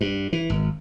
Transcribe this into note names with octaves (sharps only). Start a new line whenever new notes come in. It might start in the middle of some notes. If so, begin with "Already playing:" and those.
G2
E3
G#1